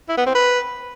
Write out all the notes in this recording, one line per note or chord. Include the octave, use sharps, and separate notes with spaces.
E4
B3
C4
B4